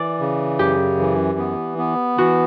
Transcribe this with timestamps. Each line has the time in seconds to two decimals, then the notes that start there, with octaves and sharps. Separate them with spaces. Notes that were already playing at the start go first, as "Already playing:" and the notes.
Already playing: E3 D5
0.20 C#3
0.59 F#2 G4
0.99 E3
1.39 B3
1.78 B3
2.17 E3 F#4